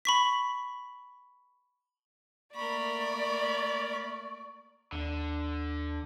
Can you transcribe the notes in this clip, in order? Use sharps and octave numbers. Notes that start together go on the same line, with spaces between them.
B5 C#6 B6
A3 A#3 A#4 D5 B5 C#6
D#2 D3